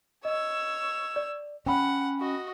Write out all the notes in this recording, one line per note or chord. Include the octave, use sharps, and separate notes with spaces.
C#5 D#5 E6
D5
C#4 F#5 G5 B5
F#4 D#5